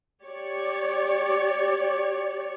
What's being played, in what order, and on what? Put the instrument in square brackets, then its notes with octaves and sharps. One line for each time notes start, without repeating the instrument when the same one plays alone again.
[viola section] G4 C#5 D5